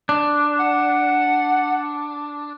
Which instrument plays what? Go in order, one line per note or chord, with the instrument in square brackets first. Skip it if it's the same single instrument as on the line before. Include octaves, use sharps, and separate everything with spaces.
[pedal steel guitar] D4
[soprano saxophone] F#5